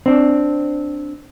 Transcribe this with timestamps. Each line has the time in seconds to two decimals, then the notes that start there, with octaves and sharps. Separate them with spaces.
0.06 C4 D4